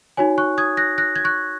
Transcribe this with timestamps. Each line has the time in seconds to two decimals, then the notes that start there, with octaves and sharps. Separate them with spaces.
0.17 D#4 F#4 C#5 G#5
0.38 C#6 F#6
0.58 D#6 G#6
0.77 F#6 A#6
0.98 F#6 A#6
1.16 G#6
1.24 C#6 F#6